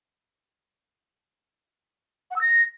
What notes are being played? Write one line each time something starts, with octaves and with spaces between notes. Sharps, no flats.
F#5
E6
A#6